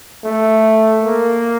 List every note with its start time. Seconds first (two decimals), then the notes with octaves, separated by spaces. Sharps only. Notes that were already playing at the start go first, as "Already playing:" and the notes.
0.25 A3
1.03 A#3